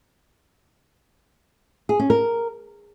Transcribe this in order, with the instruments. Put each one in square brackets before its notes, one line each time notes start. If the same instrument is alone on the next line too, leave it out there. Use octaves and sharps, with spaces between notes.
[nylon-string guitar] G#4
C#4
A#4